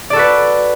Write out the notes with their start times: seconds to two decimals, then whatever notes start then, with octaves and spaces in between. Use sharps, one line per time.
0.10 D5
0.13 A4
0.16 F#4
0.19 B4